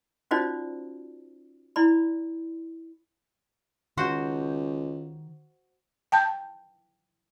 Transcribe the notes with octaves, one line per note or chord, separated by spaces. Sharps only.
C#4 D#4 F4 F#4 C5 D5
E4 D5 B5
C#2 D#3 F#4 C5
G5 A5 G6